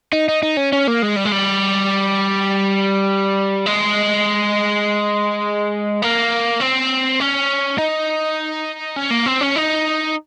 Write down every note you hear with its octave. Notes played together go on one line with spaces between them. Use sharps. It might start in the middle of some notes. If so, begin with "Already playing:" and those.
D#4
D#4
D#4
C#4
C#4
A#3
G#3
G3
G#3
G3
G#3
A#3
C4
C#4
D#4
C#4
A#3
C4
C#4
D#4